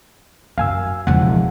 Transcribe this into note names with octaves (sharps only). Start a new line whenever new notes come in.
F#2 F5 G#5 E6
E1 C#2 F3 F#5